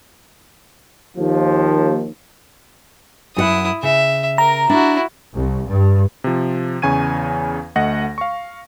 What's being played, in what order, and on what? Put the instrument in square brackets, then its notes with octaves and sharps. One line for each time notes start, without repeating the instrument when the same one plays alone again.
[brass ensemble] D#2 F3
[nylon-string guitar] F#2 F#4 F#5 [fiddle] E4 D#6
[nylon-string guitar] C#3 [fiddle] E5
[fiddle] A#4 [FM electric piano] A#5
[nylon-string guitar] D4 [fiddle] E4 F#4
[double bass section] C2
G2
[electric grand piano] C3 F3
E2 C#3 G#5 C#6 G#6 D#7
D2 A3 D#5 F#5 A#6
F5 C#6